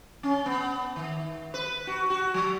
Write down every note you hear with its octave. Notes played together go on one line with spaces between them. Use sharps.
C#4
B3
D#3
B4
F#4
F#4
F#3